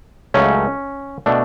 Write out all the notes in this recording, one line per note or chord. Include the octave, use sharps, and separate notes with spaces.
C#2 C#3 F#3 A3 C#4
B2 A3 D4